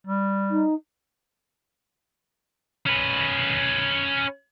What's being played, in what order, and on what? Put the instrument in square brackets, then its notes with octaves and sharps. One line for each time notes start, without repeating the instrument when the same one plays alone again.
[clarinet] G3
[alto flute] D#4
[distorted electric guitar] C#4 B4